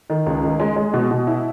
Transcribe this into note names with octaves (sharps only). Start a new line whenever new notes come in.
D#3
C#2
D#3
G#3
G#3
B2
B2
E4